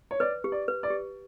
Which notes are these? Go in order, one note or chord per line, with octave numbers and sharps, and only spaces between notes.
C#5
B4 D5
G4
D5
B4
D5
G4